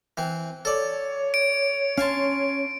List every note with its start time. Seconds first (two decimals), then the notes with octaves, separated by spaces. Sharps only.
0.17 E3 C4
0.65 A4 C#5 D5
1.34 D7
1.98 C#4 F5 G#5 A5 C6